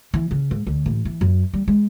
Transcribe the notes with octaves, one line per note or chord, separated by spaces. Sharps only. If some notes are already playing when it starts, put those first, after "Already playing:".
E3
C#3
G#2
D2
A1
E3
F#2
G3
G#3